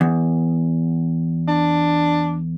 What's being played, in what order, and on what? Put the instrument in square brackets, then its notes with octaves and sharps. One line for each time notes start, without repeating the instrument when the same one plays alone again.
[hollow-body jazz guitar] E2
[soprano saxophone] D4